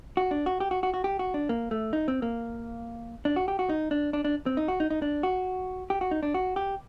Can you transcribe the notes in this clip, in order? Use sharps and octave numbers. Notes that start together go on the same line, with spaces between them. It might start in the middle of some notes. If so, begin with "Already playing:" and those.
F#4
D4
F#4
G4
F#4
F#4
F#4
G4
F#4
D4
A#3
A3
D#4
C4
A#3
D4
F#4
G4
F#4
D#4
D4
D4
D4
C4
D#4
F#4
D#4
D#4
D4
F#4
G4
F#4
D#4
D4
F#4
G4